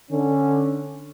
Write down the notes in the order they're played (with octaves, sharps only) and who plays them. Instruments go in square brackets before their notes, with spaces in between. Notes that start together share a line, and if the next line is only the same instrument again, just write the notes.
[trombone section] D3 C#4